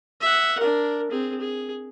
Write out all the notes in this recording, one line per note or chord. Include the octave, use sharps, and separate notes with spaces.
E5 F#5
D4 A#4
C4 G#4
G#4